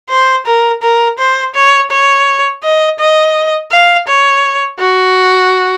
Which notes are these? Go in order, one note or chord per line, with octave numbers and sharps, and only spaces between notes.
C5
A#4
A#4
C5
C#5
C#5
D#5
D#5
F5
C#5
F#4